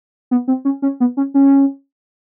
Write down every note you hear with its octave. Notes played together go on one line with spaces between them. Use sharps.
B3
C4
C#4
C#4
B3
C#4
C#4